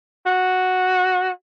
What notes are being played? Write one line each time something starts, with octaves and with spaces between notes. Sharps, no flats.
F#4